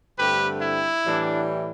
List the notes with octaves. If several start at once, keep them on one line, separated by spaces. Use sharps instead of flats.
G2 D3 A3 C4 G4 B4
E4
A2 E3 G3 D4